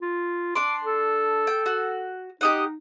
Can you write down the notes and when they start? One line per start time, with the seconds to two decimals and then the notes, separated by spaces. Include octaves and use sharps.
0.02 F4
0.55 D4 C6 D6
0.84 A4
1.47 G5
1.66 F#4
2.41 D#4 G4 D#5 F#5